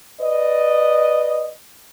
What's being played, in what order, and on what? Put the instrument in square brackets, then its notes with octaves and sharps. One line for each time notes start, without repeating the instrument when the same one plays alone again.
[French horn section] B4 D5 D#5